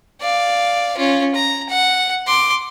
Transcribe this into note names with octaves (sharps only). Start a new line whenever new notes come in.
D5 F5
C#4 F4
A#5
F#5
C6 D6